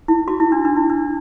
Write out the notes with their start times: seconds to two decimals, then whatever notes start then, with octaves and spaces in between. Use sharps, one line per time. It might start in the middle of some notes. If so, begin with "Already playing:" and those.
0.08 E4
0.28 F#4
0.40 E4
0.52 D4
0.65 D4
0.76 E4
0.90 D4